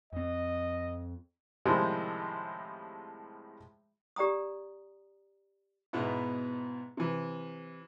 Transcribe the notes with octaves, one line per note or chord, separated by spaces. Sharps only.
F2 C4 D#5
A2 C3 D#3 F3 G3 G#3
G4 D5 G5 A#5 D#6
G#2 B2 B3 E4
C3 E3